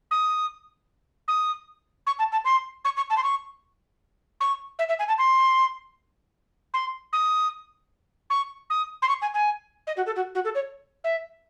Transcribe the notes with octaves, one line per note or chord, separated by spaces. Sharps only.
D#6
D#6
C#6
A5
A5
C6
C#6
C#6
A5
C6
C#6
C#6
E5
E5
G#5
A5
C6
C6
D#6
C#6
D#6
C6
C#6
G#5
G#5
D#5
F#4
A4
F#4
F#4
A4
C#5
E5